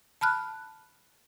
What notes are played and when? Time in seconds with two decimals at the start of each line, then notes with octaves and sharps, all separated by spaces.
0.21 A5 B5 F6 F#6